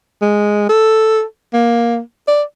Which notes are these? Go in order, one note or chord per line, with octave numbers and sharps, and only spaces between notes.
G#3
A4
A#3
D5